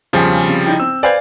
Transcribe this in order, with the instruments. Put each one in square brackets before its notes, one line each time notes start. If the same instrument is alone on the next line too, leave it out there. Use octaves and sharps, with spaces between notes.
[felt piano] E1 G#5 [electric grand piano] C#3 F3 G3
[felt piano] C3
D#4 E4 G5
[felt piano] C4 [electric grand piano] E6
[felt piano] B4 C5 G#5 [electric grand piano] D5 F5 G#6